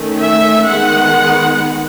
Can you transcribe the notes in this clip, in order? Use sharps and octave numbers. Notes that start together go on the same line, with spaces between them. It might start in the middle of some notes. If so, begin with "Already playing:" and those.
Already playing: D#3 A3 C#4
E5
D#3 G#3 B3 F#5